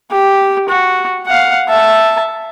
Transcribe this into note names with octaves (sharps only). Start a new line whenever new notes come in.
G4
F#4
F5 F#5
E5 A5